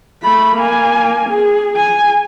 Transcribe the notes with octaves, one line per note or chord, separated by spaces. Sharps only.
A3 B5
A#3 G#5
G#4
G#5